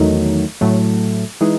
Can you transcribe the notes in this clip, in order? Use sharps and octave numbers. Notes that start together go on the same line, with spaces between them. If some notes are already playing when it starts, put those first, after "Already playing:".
Already playing: E2 D#3 F#3 A3 D#4
A2 F#3 A3
E3 G#3 D#4 G#4